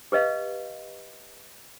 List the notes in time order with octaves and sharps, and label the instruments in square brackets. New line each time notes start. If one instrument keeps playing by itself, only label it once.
[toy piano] G4 B4 D#5 F5